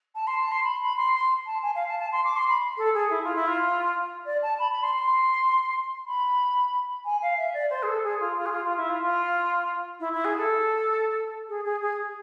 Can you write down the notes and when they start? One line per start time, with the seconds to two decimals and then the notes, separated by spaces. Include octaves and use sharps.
0.15 A5
0.27 C6
0.40 A5
0.51 C6
0.63 B5
0.81 B5
0.96 C6
1.13 C6
1.46 A5
1.62 G#5
1.75 F5
1.87 A5
1.99 A5
2.12 C6
2.24 D6
2.36 C6
2.49 B5
2.77 A4
2.94 G#4
3.10 E4
3.23 F4
3.35 E4
3.47 F4
4.25 D5
4.42 A5
4.59 B5
4.71 B5
4.82 C6
4.94 C6
6.06 B5
7.04 G#5
7.21 F5
7.37 E5
7.53 D5
7.70 C5
7.82 G#4
7.87 A4
8.03 G#4
8.20 F4
8.36 F4
8.45 G#4
8.52 F4
8.64 F4
8.77 E4
8.89 F4
9.02 F4
9.99 E4
10.13 E4
10.24 G#4
10.37 A4
11.48 G#4
11.64 G#4
11.81 G#4